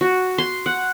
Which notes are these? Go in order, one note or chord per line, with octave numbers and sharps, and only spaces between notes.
F#4
C6
F#5